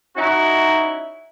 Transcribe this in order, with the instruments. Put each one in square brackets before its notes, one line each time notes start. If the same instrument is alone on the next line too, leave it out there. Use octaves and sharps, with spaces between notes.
[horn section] C#4 D#4 E4 F#4